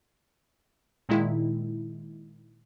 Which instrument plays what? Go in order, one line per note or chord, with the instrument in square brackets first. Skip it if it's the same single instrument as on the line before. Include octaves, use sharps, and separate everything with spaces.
[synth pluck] A#2 D#3 G#3 E4